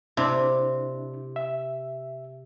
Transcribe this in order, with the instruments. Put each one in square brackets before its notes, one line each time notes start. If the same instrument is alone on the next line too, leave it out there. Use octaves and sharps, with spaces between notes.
[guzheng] C3 [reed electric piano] D4 E4
[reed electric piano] E5